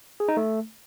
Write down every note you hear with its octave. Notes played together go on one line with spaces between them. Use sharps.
G#4
D#4
A3